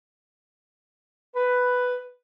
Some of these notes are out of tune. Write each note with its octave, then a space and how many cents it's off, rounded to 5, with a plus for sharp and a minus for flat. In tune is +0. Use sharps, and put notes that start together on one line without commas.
B4 +5